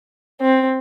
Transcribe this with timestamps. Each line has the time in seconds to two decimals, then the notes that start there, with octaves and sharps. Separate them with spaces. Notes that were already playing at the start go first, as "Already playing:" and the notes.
0.41 C4